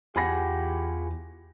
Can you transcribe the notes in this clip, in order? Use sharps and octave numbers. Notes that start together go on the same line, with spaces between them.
E2 F4 G4 G#4 F#5 G#5 B5 A#6